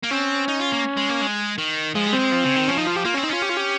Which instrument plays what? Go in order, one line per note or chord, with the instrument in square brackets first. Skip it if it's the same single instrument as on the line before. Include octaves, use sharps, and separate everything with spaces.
[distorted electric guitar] A#3
[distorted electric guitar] C4 [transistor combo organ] C#4
[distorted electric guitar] D#4
F4
A#3
G#3
A#3
G#3
D#3
[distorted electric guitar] F3 [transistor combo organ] G#3
[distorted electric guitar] G3
[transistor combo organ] C4
[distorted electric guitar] G#3
F3
C#3
D#3
[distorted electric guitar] F3 [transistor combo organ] C#4
[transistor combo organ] D#4
F4
G4
[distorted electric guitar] A#3 [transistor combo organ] F4
[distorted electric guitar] C4 [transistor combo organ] C#4
[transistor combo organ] D#4
[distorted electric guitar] C#4 [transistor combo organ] F4
[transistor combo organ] G4
F4
G4